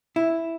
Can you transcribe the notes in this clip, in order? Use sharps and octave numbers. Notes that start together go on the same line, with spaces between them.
E4